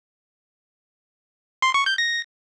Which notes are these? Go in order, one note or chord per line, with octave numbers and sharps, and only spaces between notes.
C6
C#6
G6
A#6